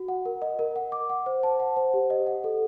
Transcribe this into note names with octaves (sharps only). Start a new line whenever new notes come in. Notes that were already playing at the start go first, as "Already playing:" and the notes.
Already playing: F#4
F#5
A#4
D#5
A#4
F#5
D6
F#5
C5
A5
F#5
C5
G4
D#5
F#5
A4